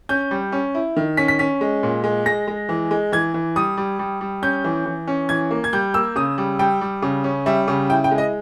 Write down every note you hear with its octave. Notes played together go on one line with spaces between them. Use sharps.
C#4 G6
G3
C#4
E4
D#3
C#4 B6
B6
C#4 B6
G#3
A#2
G#3
G#3 A#6
G#3
E3
G#3
E3 G#6
E3
G3 D#6
G3
G3
G3
C#4 G6
E3
E3
C#4
E3 G#6
A#3
G#6
G3 G6
A#3 E6
C#3 D#6
G3
G3 G5
G3
C#3
C#4
G3 E5
C#3
E4 G5
G5
G#3
D#5